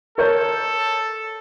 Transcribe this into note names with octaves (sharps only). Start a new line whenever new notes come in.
A4 A#4 C#5 G6